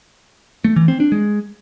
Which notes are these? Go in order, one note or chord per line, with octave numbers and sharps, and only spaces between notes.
A3
E3
C4
D4
G#3